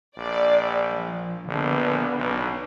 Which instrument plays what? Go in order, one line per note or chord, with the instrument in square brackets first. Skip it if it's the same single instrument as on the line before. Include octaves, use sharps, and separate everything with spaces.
[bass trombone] A#1 [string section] D5
[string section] F3
[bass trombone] A#1 [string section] D3 B3
[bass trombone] B1